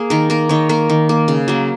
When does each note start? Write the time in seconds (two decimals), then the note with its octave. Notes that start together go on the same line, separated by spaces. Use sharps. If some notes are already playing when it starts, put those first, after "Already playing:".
Already playing: A#3 G#4
0.10 D#3 A#4
0.30 A#3 A#4
0.49 D#3 C#5
0.69 A#3 A#4
0.90 D#3
1.09 A#3
1.28 C#3
1.48 F#3 A#3